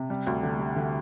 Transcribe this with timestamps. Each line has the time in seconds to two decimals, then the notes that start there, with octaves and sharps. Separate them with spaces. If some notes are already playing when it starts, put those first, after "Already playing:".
Already playing: C3
0.10 G3
0.27 D2
0.43 D3
0.59 G3
0.76 D3